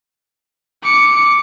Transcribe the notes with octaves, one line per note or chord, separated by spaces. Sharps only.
D6 C#7